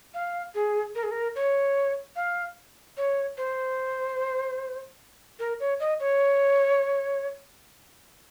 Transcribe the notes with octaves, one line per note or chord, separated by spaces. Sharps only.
F5
G#4
A#4
G#4
A#4
C#5
F5
C#5
C5
A#4
C#5
D#5
C#5